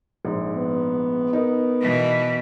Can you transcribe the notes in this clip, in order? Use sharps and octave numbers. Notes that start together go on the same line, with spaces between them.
A#1 G#2
B3
D#4 A#4
B2 E3